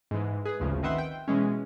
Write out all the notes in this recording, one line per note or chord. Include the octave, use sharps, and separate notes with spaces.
G#2 E3
G#4 B4
G#1 D2 C#3 F3
D#3 C4 B4 E5 F#5 C6
G5
B2 E3 G#3 C#4